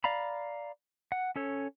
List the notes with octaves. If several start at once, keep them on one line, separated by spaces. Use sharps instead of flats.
D5 F5 A#5 B5
F#5
C#4 A4 C#5